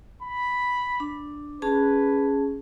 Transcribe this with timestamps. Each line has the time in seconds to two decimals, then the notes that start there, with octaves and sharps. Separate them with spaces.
0.23 B5
1.00 D4
1.62 C#4 G#4 B4 A5